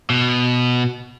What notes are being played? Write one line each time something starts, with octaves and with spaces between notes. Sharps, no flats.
B2